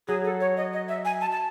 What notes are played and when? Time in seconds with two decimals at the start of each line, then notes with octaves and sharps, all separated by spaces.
0.08 F#3 G#4
0.24 A4
0.41 C#5
0.57 D#5
0.73 D#5
0.88 E5
1.05 G#5
1.21 A5
1.32 A5